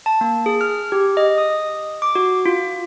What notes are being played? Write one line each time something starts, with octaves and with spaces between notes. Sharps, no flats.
A5
A#3
G#4
F6
G4
D#5
D#6
D6
F#4
F4